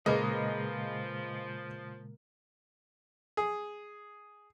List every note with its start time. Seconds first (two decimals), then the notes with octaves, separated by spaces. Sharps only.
0.06 A#2 C#3 F3 G#3 A#3 G#4 B4 D#5
3.37 G#4